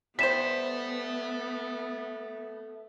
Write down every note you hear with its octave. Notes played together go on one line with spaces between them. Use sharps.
G3 B3 A4 C5 E5 B6 E7